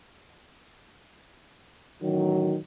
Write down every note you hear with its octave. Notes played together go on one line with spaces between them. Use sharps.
A1 D#3 F#3